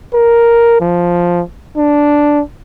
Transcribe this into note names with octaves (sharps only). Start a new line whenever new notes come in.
A#4
F3
D4